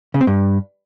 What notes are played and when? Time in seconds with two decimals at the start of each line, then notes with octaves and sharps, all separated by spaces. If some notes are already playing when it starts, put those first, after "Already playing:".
0.14 C#3
0.21 C4
0.27 G2